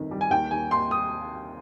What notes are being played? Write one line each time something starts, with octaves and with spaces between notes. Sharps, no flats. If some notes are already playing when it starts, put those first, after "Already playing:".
Already playing: G1 C2 F2 D#3
G3
G#5
D#2 G5
D#2 G#5
D#2 C6
D#6